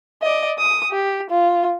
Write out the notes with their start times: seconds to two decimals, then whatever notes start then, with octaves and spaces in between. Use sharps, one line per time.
0.22 D5 D#5
0.58 D#6
0.91 G4
1.30 F4